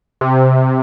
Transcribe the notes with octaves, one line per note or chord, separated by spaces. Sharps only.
C3